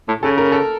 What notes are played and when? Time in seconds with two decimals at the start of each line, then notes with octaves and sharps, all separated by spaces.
0.08 A2
0.23 C#3 A4
0.38 A#4
0.52 A4